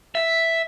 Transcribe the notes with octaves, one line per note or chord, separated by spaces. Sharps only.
E5